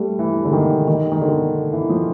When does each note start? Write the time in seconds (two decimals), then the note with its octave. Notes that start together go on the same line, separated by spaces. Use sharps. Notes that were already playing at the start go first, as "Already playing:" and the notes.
Already playing: G3 A3
0.19 E3
0.45 D3
0.53 D#3
0.88 D#3
1.12 D#3
1.21 D3
1.73 E3
1.90 F3